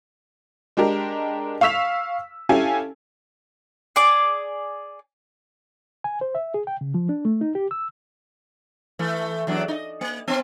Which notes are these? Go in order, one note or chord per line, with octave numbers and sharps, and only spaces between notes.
G#3 D4 G4 A#4
F5 C#6 E6 B6 F7
C#4 E4 G4 A4 F5 G#5
G#4 D5 D6
G#5
C5
E5
G#4
G5
C#3
F3
D4
A3
D#4
G4
E6
E3 A3
E2 F#3 D4
D#4 D#5
A#3
B3 C4